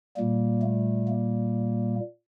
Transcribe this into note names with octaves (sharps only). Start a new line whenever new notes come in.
A#2 G3 A#3
A3
A#3